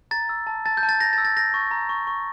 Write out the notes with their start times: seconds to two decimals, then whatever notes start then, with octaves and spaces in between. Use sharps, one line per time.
0.11 A#5 A6
0.29 E6
0.47 A5
0.66 A5 A6
0.77 G6
0.83 A5
0.89 A6
1.00 G6 A#6
1.13 A6
1.18 E6
1.25 A6
1.37 G6 A#6
1.54 C#6
1.71 A#5
1.89 C#6
2.07 C#6